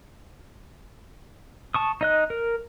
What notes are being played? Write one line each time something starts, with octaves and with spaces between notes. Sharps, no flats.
A5 C#6 D#6
D#4 D#5 F#6
A#4